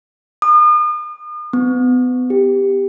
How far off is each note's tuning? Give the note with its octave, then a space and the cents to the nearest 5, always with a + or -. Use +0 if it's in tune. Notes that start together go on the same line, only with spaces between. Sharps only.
D#6 -40
B3 +30
G4 +10